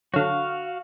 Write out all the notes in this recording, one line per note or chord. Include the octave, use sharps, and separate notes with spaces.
D3 F#3 F#4 F5